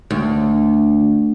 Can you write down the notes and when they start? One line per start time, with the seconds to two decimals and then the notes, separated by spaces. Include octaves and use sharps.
0.11 D2